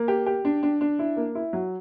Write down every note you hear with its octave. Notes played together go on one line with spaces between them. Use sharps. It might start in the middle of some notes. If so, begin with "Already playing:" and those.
Already playing: A#3
G4
G4
D4
D4
D4
E4
A#3
E4
F#3